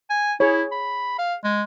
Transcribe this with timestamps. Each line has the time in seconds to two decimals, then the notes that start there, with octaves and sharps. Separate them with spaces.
0.10 G#5
0.40 E4 G#4 C#5
0.72 B5
1.19 F5
1.44 G#3